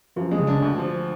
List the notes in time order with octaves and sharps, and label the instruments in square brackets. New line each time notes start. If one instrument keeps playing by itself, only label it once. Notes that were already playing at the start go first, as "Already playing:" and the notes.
[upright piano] F#2 [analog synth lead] F3
[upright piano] G#3
[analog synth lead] C#3
[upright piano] D4
D2
F3